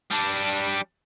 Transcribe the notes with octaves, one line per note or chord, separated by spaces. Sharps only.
G3 D4